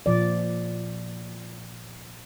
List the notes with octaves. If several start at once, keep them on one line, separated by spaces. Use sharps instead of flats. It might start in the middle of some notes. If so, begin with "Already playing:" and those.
A#2 F3 D5